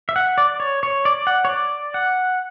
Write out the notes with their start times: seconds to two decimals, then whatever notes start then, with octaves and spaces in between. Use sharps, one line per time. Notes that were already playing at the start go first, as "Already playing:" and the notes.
0.09 E5
0.16 F#5
0.38 D5
0.60 C#5
0.83 C#5
1.05 D5
1.27 F#5
1.45 C#5
1.49 D5
1.94 F#5